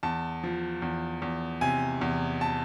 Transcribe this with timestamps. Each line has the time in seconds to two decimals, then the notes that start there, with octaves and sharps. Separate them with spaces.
0.03 E2 A5
0.43 F3
0.82 E2
1.22 E2
1.61 C3 G#5
2.01 E2
2.41 A5